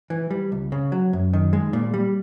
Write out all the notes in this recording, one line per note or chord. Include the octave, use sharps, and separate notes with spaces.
E3
G3
C#2
C#3
F#3
F#2
D#3
G#3
A#2
G3